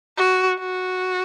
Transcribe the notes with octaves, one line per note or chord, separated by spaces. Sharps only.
F#4
F#4